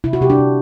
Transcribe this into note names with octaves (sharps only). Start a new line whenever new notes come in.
C3 E4
F#4
C3 G4
D4
C3